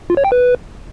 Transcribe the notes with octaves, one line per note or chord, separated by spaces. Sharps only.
F4
C#5
G5
B4